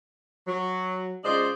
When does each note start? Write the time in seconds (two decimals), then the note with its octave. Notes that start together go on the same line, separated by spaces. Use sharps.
0.48 F#3
1.24 C#3 G#3 F4 C5 D5 D#5